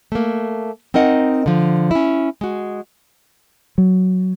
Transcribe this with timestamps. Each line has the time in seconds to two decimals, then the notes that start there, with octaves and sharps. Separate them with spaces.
0.12 A3 A#3
0.94 C4 D#4 A#4 D#5 F#5
1.46 D3 F3
1.91 C#4 E4
2.41 G#3 F#4
3.78 F#3